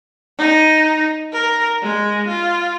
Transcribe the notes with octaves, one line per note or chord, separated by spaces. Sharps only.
D#4
A#4
G#3
F4